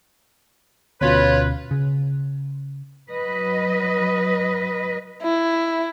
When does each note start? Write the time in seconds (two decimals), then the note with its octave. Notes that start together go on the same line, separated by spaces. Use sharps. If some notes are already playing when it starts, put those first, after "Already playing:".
1.01 D2 B2 C#4 F4 B4 C#5
1.71 C#3
3.11 F#3 B4 D#5
5.22 E4